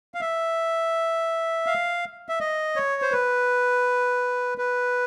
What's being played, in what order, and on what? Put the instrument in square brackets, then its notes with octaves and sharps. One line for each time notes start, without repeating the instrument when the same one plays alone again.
[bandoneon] F5
E5
F5
E5
D#5
C#5
C5
B4
B4